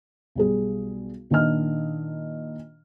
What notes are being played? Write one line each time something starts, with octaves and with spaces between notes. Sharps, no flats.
B1 G3 G#4
A#2 D#3 D4 D#5 F6